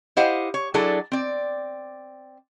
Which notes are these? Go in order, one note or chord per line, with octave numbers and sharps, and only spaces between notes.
E4 G4 C5 D#5 F5 F#5
C#5
F#3 D4 E4 G#4 A4 D5
C4 D5